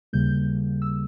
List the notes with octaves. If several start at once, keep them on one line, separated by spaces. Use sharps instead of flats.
D#2 C#3 G3 A#3 G6
E6